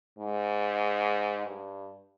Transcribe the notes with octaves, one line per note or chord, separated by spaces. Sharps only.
G#2
G2